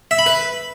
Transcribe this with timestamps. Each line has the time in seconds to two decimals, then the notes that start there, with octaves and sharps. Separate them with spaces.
0.11 E5
0.19 B5
0.26 B4